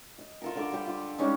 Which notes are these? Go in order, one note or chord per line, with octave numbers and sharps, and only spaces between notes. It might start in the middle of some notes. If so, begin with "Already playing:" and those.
D#5
F4 A4 A#4
D3 A4 D6
G3 G4
F4
G3 G#3 C#4 D#4